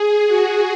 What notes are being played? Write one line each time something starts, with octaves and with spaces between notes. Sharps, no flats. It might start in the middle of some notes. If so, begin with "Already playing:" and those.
Already playing: G#4
F#4